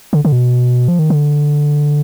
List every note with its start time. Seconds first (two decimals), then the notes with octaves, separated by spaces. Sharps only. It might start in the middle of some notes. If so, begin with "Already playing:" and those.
0.13 D3
0.25 D3
0.32 B2
0.88 F3
0.99 D#3
1.10 D3